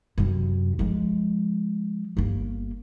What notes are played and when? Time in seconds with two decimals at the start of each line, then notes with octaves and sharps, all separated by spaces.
0.18 F#2 C3
0.79 F3 G#3
2.17 G1 A#3